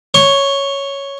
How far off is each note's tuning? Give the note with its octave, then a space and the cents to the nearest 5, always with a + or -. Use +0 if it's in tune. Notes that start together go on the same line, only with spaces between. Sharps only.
C#5 +0 C6 +45